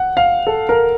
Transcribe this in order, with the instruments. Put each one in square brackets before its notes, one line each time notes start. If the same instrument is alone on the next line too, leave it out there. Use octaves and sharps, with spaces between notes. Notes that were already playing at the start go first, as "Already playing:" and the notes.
Already playing: [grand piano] F#5
F5
A4
A#4